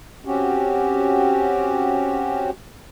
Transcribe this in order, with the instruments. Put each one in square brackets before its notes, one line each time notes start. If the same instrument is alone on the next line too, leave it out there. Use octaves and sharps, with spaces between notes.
[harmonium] C4 C#4 F#4 G4